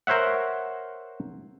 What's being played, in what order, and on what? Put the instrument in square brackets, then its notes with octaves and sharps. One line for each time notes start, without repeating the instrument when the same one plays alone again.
[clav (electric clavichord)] A#4 C5 C#5 E5 F#5